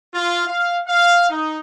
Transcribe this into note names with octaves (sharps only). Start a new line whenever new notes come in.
F4
F5
F5
D#4